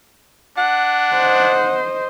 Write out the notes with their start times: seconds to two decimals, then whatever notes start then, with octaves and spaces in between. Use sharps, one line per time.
0.58 D4 F#5
1.16 C5 D#5